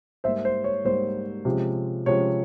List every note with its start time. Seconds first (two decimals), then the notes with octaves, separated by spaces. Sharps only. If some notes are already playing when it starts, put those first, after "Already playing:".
0.24 G#2 G3 A#3 C5 E5
0.45 C5
0.64 C#5
0.85 G#2 G3 A#3 C5
1.45 C3 F3 G#3 C#4
2.06 C3 F3 G#3 C#4 C#5